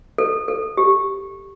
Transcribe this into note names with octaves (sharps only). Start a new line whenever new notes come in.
A4
A4
G4